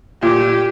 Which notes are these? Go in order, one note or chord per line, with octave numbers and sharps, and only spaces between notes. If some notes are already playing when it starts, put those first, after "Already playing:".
A#2 G4